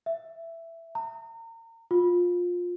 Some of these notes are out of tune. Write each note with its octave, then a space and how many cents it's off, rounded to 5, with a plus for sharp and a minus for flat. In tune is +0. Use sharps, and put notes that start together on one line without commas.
E5 +10
A#5 -35
F4 +20